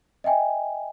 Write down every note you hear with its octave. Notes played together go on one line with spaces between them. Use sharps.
D#5 E5 G5 G#5